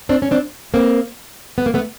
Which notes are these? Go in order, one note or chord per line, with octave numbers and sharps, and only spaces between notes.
C4 D4
C#4
C4 D4
A#3 C4
B3
A#3
A3 B3